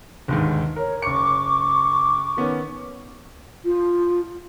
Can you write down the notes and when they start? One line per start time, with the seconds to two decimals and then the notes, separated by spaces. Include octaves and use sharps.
0.28 G1 D#2 G#2
0.76 A#4 C#5
1.02 F#1 C#6 D6 C#7
2.37 D#3 B3 C#4
3.65 F4